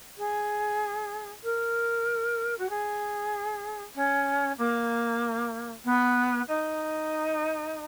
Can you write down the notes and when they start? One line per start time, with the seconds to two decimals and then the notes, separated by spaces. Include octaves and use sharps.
0.17 G#4
1.43 A#4
2.58 F#4
2.69 G#4
3.95 C#4
4.58 A#3
5.84 B3
6.47 D#4